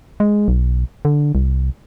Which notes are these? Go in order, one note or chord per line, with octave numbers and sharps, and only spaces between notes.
G#3
B1
D3
C2